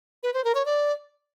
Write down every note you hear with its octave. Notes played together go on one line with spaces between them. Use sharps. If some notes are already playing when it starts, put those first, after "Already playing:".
B4
C5
A#4
C#5
D5